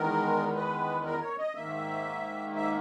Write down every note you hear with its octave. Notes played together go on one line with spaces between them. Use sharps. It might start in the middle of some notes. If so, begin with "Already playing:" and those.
Already playing: E2 D#3 G#3 B3 A#4
B4
A#4
C#5
D#5
G#2 D#3 A#3 E5
E5